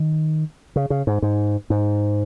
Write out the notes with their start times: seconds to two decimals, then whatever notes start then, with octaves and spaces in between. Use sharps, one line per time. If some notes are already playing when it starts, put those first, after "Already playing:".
Already playing: D#3
0.76 C#3
0.90 C#3
1.07 G#2
1.22 G#2
1.70 G#2